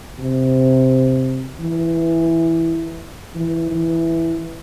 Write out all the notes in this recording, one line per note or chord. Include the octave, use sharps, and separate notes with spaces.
C3
E3
E3
E3